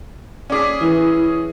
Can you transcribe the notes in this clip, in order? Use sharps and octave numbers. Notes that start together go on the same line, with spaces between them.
C#4 G#4 D5 D6 B6
E3 E4